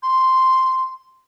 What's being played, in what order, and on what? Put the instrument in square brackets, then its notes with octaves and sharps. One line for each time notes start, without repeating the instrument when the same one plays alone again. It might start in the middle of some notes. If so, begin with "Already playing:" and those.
[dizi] C6